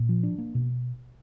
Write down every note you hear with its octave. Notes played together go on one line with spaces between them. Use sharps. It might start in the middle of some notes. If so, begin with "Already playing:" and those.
Already playing: A#2
F3
D4
A#3
B2